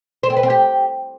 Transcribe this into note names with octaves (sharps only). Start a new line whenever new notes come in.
C5
C4
B4
C4
G4